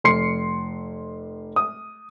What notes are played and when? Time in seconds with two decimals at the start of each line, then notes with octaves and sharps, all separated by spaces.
0.04 F1 C6 C7 C#7
1.56 D#6